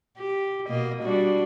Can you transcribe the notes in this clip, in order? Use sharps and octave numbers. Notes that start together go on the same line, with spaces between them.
G4
B2 A#3 D#5
G3 D4 F#4